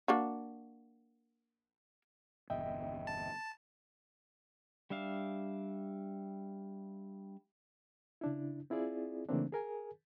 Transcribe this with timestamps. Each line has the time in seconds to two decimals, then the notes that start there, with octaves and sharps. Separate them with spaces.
0.08 A#3 D4 F#4
2.50 G1 E2 B2 D#5 E5 G5
3.07 A5
4.90 G3 D4 E5 F5
8.21 C#3 D4 E4
8.70 C4 E4 F4 G#4 D5
9.29 C#3 E3 A3 A#3 C4 D4
9.52 G#4 A#4 G#5